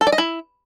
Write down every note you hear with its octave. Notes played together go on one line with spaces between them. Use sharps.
A4
D5
D#5
E4